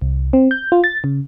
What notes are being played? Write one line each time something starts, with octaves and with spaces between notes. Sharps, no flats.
C2
C4
G6
F4
A6
C#3